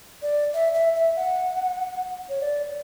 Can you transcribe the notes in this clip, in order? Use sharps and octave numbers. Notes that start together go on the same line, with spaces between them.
D5
E5
E5
E5
F#5
C#5
D5